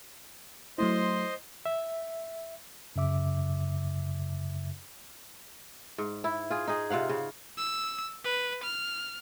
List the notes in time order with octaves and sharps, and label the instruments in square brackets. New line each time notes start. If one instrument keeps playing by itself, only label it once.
[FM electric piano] F#3 A3 E4 [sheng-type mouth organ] C5 D#5 C6
[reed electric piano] E5
[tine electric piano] F#2 C#3 E5 D6
[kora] G#2
E4
F4 G#4
D#4 G#4
C3 F4 F5 F#5
C#3
[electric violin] E6
B4
F6